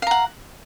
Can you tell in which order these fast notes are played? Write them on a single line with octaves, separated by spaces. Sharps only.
F5 A#5 F#5